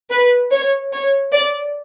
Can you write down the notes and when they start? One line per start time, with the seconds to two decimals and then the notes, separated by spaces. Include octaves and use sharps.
0.10 B4
0.52 C#5
0.93 C#5
1.33 D5